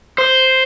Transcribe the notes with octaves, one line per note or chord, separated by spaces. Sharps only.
C5